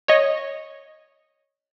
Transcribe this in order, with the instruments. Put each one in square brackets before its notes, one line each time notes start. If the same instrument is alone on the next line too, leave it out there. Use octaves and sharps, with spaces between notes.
[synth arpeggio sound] C#5 D#5